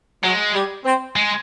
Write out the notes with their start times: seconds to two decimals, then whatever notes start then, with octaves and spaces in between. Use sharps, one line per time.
0.23 F#3 G#3
0.54 G3
0.85 C4
1.16 G#3